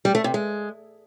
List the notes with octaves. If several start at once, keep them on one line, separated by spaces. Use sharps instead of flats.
G3
A3
C3
G#3